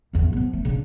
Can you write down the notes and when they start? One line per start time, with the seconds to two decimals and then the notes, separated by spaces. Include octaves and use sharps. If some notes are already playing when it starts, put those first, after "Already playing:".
0.13 G#1 E2
0.33 F3 B3
0.53 A3
0.65 C#3 D4